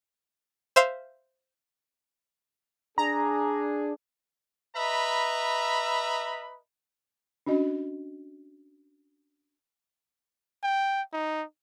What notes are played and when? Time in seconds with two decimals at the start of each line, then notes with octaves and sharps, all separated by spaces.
0.76 C5 E5 F5 C6
2.98 D4 G#4 A#5
4.75 B4 D#5 E5 A#5 B5
7.46 C#4 D4 F#4 D#5
10.63 G5
11.13 D#4